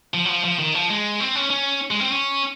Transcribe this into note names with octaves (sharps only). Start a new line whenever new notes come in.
F3
F#3
F3
F3
D#3
F3
G#3
C4
C#4
C#4
G#3
C4
C#4